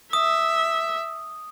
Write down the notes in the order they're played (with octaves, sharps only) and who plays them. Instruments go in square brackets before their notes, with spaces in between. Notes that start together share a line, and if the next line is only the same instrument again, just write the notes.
[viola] E5 [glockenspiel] D#6